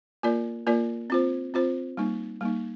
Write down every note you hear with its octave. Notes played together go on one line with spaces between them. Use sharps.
A#3 F4 A#4 D5
A#3 F4 A#4 D5
C4 F4 C5
C4 F4 C5
G3 A#3 D#4
G3 A#3 D#4